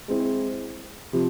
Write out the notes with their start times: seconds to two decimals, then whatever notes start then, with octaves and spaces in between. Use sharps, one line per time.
0.08 G#3 C4 E4
1.13 C3 F3